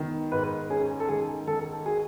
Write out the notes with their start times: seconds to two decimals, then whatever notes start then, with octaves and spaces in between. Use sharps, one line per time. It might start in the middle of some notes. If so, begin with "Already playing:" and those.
Already playing: D#3 B3
0.32 G#2 B4
0.70 C#4 G#4
1.00 A4
1.09 D#3 G#4
1.47 D#3 A4
1.86 F#4 G#4